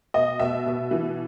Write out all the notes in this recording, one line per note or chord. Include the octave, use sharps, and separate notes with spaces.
B2 D#5
B2 E5
B2
E3